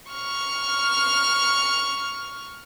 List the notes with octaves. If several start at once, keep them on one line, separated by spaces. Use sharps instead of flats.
C#6 F6